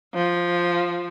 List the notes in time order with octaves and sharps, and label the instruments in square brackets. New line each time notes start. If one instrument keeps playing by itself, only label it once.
[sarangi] F3